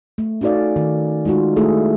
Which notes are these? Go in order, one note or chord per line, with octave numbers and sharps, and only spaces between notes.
A3
C#4 D#4 F#4 A4 D5 F5
D#3
G#3 D#4 F4 F#4
A3 E4 G#4 A4